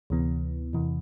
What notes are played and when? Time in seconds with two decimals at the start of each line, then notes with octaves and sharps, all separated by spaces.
0.10 D2 C3 E3 B3
0.73 E2 C3 E3